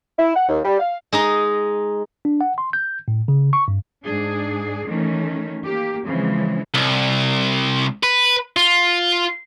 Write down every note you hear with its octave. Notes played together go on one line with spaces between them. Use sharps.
E4
F#5
D#2
G3
F5
G#3 D#4 D#5
D4
F#5
C6
G6
A2
C#3
C#6
G2
G#2 D4 G#4
D#3 E3 A3 C#4
A#3 G4
C#3 E3 F3 G#3 C4
C2
B4
F4